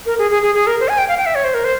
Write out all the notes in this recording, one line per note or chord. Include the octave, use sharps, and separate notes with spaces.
A#4
G#4
G#4
G#4
G#4
A#4
C5
G#5
G5
F5
G5
E5
C#5
C5
A#4
C5